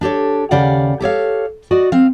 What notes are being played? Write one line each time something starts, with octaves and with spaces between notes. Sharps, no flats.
D4 G4 A4 C#5
D#2 C#3 G4 D5 F5 F#5
G4 A4 C#5 F5
F#4 D5 D#5
C4 F5